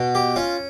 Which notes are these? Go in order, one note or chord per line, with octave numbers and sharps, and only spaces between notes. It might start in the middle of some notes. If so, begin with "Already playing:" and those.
Already playing: B2
G4
C#4 F4